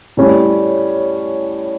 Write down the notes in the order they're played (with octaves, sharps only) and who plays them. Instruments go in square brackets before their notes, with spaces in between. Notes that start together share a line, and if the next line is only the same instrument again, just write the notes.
[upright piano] A2 G3 C#4 G4